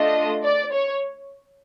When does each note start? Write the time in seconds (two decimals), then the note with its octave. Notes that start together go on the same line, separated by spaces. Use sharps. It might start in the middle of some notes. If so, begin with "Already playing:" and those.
Already playing: A3 D4 F4 D#5
0.44 D5
0.72 C#5